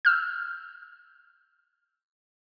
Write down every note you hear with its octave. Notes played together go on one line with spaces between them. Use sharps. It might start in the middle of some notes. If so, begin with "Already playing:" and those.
E6 F6 G6